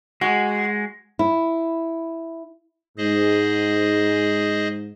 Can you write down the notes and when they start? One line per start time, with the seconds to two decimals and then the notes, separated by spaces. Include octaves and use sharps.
0.21 G#3 F#4
1.19 E4
2.98 G#2 G#4 C5 D#5